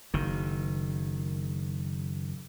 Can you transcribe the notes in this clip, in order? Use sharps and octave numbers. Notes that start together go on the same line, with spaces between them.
F#1 D#3